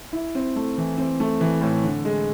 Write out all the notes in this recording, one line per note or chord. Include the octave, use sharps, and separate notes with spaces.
E4
C4
A3
E3
C4
A3
E3
A2
D3
G#3